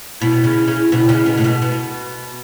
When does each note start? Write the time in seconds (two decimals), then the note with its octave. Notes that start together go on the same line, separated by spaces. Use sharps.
0.21 B2 E4
0.44 C#3
0.68 C#3
0.92 B2
1.09 C#3
1.26 B2
1.37 A2
1.44 B2
1.62 B2